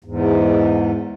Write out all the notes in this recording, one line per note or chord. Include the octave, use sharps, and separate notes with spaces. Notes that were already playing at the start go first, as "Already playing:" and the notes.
E2 G#2